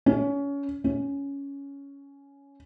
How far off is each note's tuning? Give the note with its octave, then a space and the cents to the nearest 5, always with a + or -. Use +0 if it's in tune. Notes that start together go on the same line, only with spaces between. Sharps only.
C#4 +25
C#4 +10